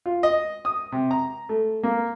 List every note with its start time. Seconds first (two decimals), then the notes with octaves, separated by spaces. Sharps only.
0.06 F4
0.23 D#5
0.65 D#6
0.92 C3
1.11 A#5
1.49 A3
1.83 A#3